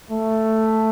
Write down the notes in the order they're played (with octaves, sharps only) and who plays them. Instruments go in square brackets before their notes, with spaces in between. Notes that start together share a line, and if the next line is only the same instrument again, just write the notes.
[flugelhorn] A3